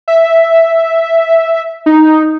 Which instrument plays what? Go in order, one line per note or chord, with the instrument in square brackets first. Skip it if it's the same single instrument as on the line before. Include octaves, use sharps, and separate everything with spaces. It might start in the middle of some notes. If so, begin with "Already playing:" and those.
[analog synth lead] E5
D#4